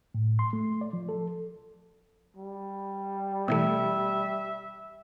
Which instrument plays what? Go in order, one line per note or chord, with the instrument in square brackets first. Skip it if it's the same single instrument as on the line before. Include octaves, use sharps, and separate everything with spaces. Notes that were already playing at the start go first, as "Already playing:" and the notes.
[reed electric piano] A2
C6
A3
D5
F3
A4
[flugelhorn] G3
[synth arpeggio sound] B2 E3 A3 [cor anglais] E5